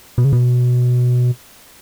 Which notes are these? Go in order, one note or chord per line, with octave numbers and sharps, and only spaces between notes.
B2
C#3
B2